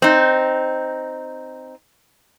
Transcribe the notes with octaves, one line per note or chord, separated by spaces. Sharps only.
C4 D#4